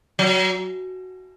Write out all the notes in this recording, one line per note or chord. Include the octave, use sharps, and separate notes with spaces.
F#3